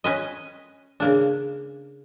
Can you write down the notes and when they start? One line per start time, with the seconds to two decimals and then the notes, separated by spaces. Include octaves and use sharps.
0.04 C#4 B4 D#5
1.00 C#3 A#3 D4